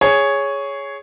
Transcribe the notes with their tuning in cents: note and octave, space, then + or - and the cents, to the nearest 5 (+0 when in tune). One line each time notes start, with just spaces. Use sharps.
G#4 +0 C#5 +5